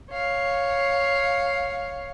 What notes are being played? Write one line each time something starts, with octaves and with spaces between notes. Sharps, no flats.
C#5 F5